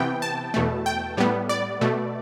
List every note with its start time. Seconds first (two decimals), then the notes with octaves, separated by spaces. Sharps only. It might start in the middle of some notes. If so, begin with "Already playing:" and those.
Already playing: C3 E3 B3 G5
0.22 A5
0.54 E2 B2 A3
0.86 G5
1.17 A2 G3 B3
1.49 D5
1.81 B2 A3